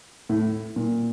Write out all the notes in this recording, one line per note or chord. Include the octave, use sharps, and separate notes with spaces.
A2
A#2